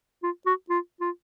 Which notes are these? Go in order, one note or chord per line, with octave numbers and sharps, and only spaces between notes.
F4
F#4
F4
F4